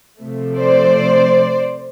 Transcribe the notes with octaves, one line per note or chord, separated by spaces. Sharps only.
C3 F3 A3
C5 D5